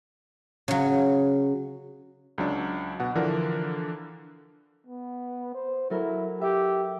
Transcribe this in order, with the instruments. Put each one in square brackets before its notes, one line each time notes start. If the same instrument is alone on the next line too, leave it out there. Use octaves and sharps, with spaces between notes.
[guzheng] C#3 F#3
[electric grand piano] C#2 F#3 D4
B2 F#5
D3 E3 F3 D4 A#4
[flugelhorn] B3
C5
[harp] F#3 A4 A#4 [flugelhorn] E4
[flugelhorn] G4 [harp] E5